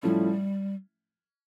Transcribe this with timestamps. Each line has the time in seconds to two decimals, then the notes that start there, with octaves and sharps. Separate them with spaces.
0.03 A2 F3 G3 A3 C#4 E4